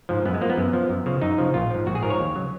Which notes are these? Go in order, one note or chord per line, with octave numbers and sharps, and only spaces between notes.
G#2 F3
F#2 B3
G#3
F3 A#3
B3
F#2
F3
F#2
C#3 F3
F#2 D#4
C#3 F3
A#1 F4
G#2 F3
A#1 F#4
G#4
G#2 F3 A#4
C#5
D#2
C#3 F#3